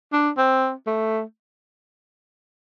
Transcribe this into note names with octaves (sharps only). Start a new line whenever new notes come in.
D4
C4
A3